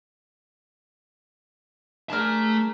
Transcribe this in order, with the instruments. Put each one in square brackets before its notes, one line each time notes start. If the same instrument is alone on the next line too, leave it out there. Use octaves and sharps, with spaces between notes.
[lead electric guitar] A3 A5 [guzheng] D4 G#4 A#4